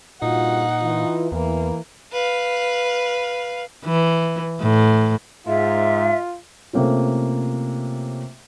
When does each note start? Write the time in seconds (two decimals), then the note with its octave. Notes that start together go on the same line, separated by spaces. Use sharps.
0.22 G2 A#2 D#4 F4 F#4 F#5
0.82 E3 F4
1.32 E2 E3 A#3
2.13 B4 F5
3.85 E3
4.61 A2
5.47 G#2 F4 E5
6.73 C3 A3 A#3 C#4 F4